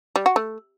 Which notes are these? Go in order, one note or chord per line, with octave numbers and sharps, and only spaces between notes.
G3
F#4
A3